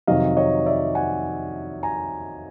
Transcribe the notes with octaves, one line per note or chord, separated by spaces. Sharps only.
F2 C3 D#3 F#3 D#5 F5
C#5 D#5
D5 E5
F#5 G#5
G#5 A#5